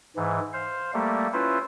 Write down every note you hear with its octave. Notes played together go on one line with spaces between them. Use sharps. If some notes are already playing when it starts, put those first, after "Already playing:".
G#2 E3
C5 F5
G3 A3 A#3
C#4 E4 F4 B4 C5